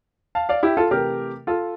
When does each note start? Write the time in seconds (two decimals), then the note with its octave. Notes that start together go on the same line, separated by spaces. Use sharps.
0.35 F5 A5
0.49 D5 F5
0.63 E4 G4
0.77 F4 A4
0.91 C3 E3 A3 G4 A#4
1.47 F4 A4